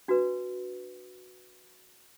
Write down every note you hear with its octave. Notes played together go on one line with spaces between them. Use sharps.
D4 F#4 B4